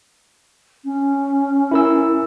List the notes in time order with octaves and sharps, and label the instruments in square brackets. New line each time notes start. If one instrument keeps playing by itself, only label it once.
[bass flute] C#4
[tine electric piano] E4 A#4 E6